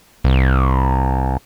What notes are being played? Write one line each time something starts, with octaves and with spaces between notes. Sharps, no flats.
C2